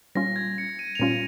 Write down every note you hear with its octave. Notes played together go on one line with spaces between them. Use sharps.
A#2 G3 C#4 F4 A#6
G#6
C#7
D#7
F7
A#2 G3 C#4 F4 D#7